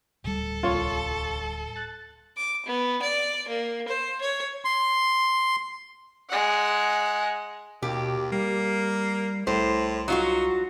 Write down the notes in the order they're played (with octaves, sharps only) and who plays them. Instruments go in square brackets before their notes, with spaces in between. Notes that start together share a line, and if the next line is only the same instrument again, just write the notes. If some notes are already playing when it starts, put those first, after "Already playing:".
[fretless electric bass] D1 G3 [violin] A4
[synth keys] C2 C#5 C#6 [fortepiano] F4
[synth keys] F#6 A6
[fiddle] D6
B3
D5
A#3
C5
C#5
[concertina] C6
[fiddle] G#3 F#5
[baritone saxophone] D#2 [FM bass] B2 [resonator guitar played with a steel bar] G4
[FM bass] G3 [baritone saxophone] A#3
[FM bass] C2 [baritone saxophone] A2 [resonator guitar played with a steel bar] C5
[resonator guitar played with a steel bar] F#3 F4 F#4 [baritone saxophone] D#4